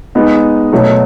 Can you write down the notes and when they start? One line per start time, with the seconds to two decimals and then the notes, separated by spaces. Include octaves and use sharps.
0.15 G#3 B3 D#4
0.73 B2 F#3 A3